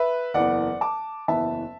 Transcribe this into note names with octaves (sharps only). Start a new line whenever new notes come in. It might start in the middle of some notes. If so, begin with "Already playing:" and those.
Already playing: B4 E5
F#1 E2 E3 B3 D5 F#5
A5 D6
F#1 E2 E3 B3 E5 A5